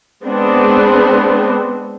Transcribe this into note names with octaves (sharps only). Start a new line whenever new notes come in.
G#3 B3 C4 D4